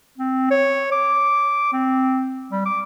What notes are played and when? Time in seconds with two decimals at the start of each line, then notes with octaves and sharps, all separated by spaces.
0.18 C4
0.51 C#5
0.92 D6
1.73 C4
2.52 G3
2.66 D6